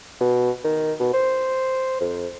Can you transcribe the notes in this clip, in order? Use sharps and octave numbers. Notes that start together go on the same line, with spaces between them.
B2
D#3
B2
C5
F2